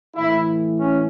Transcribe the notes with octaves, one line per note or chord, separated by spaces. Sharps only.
A2 E3 E4
C#4